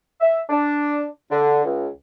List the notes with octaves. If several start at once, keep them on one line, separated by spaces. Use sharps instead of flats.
E5
D4
D3
C#2